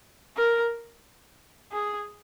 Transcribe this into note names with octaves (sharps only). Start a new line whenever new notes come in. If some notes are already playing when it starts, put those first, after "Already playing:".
A#4
G#4